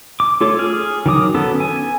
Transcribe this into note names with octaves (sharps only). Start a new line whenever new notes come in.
D6
A3 F4 A4 C#5 D6
G#4 F6
D#3 F#3 D6 D#6
B3 C#4 A4
G#5